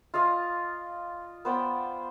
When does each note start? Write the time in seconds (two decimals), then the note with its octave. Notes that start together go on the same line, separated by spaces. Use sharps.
0.14 F4 D5 D#5 F5
1.45 B3 C5 D5 G5